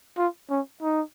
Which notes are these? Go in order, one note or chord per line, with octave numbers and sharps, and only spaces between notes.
F4
C#4
D#4